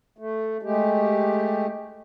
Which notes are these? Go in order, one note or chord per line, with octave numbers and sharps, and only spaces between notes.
A3
G#3 A3 G4